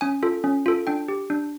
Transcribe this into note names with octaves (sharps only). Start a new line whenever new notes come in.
C#4 G#5
F4 A4
C#4
F4 A4
D4 G5
G4
D4